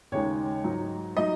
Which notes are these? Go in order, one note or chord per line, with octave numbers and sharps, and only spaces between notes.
D#2 C#3 G#3 D#4 C#5
G#2 F#3 D#4
F#3 D#4 D#5